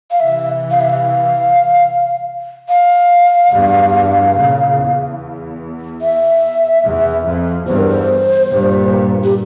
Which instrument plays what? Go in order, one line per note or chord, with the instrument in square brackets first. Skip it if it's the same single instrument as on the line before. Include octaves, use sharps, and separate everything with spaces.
[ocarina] F5
[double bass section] C3 E3 [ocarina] E5
[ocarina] F5
E5
F5
F5
[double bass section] E2 G2
A#2 C#3
E2
[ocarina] E5
[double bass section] E2
F2
[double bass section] E2 G2 [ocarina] C5
[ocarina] A#4
C5
[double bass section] G2 A#2
[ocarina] G4